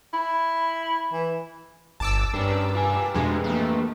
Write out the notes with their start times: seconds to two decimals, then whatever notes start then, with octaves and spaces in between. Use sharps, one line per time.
0.14 E4
1.13 E3
2.00 G1 A5 D6 E6
2.34 G2 C#4 D4 G4 A#4 B4
2.75 F4 G#5
3.14 F2 B2 G#3 D4 F#4
3.44 E3 A3 A#3 D4